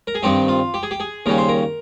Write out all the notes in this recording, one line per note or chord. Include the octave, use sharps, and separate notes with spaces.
A#4
G#4
G2 D#3 G3 C4 D#4 G4
F4
G4
G#4
G4
G#4
D#2 C#3 G3 C#4 A#4
C5
A#4